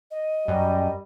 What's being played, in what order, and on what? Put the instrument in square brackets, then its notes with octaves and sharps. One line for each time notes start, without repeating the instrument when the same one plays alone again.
[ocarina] D#5
[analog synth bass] F#2 [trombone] G3